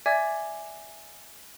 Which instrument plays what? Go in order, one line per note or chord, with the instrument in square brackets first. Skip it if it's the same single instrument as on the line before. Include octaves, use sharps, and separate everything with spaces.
[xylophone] D5 E5 G#5 D6 G#6 A6